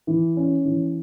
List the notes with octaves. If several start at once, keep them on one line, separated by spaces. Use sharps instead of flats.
E3
C#4
E3